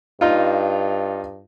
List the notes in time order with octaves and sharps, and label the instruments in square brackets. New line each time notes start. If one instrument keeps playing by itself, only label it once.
[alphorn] G2 [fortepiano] D#4 F4